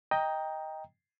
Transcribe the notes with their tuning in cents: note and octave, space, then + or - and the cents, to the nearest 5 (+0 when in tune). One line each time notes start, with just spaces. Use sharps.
D#5 +10 G5 +10 A#5 +0